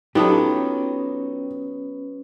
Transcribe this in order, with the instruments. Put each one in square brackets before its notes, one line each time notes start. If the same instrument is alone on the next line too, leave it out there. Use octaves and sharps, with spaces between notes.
[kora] F#3 B3 [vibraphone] C#4 B4 [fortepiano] D#4 A4 [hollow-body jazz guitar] F4 G4